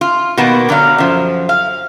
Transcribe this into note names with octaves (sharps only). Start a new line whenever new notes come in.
F4
B2 D#3 A#3 B3
D3 F#3 D5 F5
F#2 F3
F5